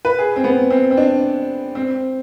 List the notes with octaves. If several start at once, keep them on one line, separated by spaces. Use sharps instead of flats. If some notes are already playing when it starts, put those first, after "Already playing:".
B4
G#4
C4
B3
C4
C4
D4
C4